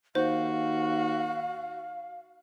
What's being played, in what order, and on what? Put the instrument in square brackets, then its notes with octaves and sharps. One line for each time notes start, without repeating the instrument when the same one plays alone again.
[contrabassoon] D#2 [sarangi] F#4 [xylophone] C5 [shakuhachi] F5